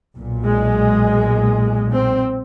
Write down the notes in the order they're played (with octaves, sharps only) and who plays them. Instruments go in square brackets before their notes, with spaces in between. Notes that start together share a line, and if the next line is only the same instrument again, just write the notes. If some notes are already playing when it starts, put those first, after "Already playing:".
[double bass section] B1 A#2
G#3
C4